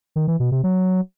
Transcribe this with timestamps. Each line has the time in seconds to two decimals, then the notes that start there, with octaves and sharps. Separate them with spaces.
0.16 D#3
0.28 E3
0.40 B2
0.52 C3
0.64 F#3